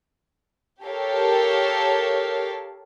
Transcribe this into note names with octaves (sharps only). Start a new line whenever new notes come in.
G4 A4 A#4 C#5 F5